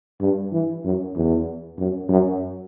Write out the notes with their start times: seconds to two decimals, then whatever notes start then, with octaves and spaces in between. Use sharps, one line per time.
0.21 G2
0.53 E3
0.85 F#2
1.15 E2
1.78 F#2
2.09 F#2